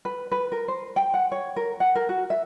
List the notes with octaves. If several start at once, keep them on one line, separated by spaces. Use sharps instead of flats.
B4
B4
A#4
C5
G5
F#5
C#5
A#4
F#5
A#4
F#4
E5